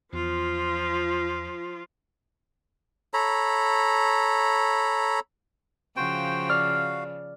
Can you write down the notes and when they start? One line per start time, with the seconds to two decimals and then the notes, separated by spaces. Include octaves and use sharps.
0.13 E2 F3 F4
3.14 A4 C#5 A#5 B5
5.96 C#3 F3 F#4 C5 G5
6.49 F#4 D5 F5 F6